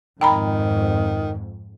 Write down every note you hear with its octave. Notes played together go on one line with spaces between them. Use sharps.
F2 G#2 D#3 G5 A#5 B5